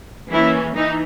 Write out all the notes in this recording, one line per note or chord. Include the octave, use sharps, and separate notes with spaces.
E3 A#3 C#4 E4
E3 D#4